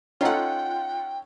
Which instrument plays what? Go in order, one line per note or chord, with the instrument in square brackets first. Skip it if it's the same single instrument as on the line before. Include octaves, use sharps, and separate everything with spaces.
[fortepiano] C#4 D#4 A4 [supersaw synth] F4 F#5 [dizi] G5